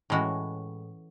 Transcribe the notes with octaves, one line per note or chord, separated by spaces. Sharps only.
A2 E3 G#3 C#4 F#4